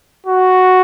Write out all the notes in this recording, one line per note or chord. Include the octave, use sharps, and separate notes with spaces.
F#4